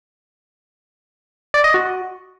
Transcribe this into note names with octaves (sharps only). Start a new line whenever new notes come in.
D5
D#5
F#4